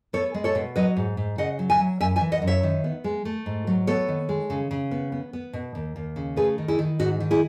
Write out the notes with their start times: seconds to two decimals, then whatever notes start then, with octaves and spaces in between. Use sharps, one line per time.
0.13 B3 A4 C#5
0.34 G#3
0.44 A4 C#5
0.55 B2
0.76 F#3 B4 D#5
0.97 G#2
1.17 G#2
1.38 C#3 D#5 F#5
1.59 F#3
1.70 E5 G#5
1.80 F#3
2.01 F#2 E5 G#5
2.16 E5 G#5
2.21 E3
2.32 D#5 F#5
2.42 F#2
2.47 C#5 E5
2.63 D#3
2.84 B3
3.04 G#3
3.25 A3
3.46 G#2
3.67 F#3
3.87 B3 A4 C#5
4.08 D#3
4.29 G#3
4.50 C#3
4.71 C#3
4.91 B3
5.12 B3
5.33 B3
5.53 B2
5.75 D#2
5.96 D#2
6.16 C#3
6.36 A3 G#4 B4
6.58 D#3
6.68 E4 G#4
6.79 D#3
6.99 G#2 D#4 F#4
7.20 D#3
7.31 E4 G#4